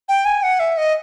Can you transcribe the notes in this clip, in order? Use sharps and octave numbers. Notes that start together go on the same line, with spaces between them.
G5
G#5
F#5
E5
D#5